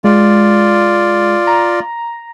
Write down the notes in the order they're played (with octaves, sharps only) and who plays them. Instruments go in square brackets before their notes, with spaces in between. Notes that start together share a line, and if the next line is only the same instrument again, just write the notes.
[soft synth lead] G#3 [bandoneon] F4 D5
[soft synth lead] A#5